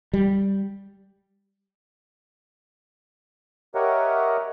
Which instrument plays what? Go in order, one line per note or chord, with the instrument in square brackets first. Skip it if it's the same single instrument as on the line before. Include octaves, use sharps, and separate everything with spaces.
[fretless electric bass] G3
[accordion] G4 A#4 C#5 D#5 E5 F#5